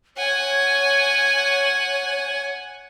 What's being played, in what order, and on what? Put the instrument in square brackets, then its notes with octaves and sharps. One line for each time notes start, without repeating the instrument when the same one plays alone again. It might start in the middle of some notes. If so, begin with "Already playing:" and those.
[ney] C#5 [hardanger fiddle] F#5 G#5